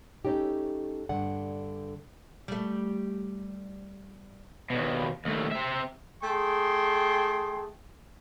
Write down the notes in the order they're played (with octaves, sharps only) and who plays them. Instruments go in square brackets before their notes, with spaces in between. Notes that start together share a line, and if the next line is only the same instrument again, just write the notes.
[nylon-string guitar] A3 C#4 D#4 G4
G2 D3 D5 F#5
[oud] G3 A3
[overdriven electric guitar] D#2 B2
D#2 A3
C4 E5
[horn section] A3 G#4 G5 C6